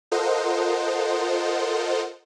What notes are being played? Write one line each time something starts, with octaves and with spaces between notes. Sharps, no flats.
F4 A4 A#4 C5 D#5 F#5